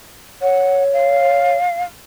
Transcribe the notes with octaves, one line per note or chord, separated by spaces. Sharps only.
C#5 F#5
F5